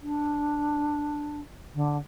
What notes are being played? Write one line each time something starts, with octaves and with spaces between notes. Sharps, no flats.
D4
D3